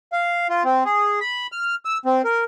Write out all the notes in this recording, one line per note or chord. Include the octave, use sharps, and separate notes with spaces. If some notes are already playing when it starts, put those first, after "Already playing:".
F5
F4
C4
G#4
B5
F6
E6
C4
A#4